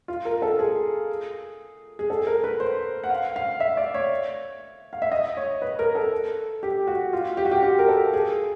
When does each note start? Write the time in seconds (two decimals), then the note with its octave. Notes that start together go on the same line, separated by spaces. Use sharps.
0.08 F4
0.25 A#4
0.42 A4
0.59 G#4
1.99 G#4
2.10 A4
2.27 A#4
2.44 B4
2.60 C5
3.04 F#5
3.10 F5
3.36 F5
3.60 E5
3.77 D5
3.94 C#5
4.93 F5
5.02 E5
5.12 D#5
5.37 C#5
5.62 B4
5.79 A#4
5.95 A4
6.63 G4
6.87 F#4
7.13 F4
7.37 G4
7.45 F#4
7.51 G4
7.63 G4
7.79 A#4
7.88 A4
8.13 G#4